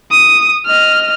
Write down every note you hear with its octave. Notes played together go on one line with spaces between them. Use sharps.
D#6
D#5 F6